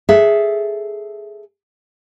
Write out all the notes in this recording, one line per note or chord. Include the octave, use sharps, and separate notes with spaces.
G#4 A4 E5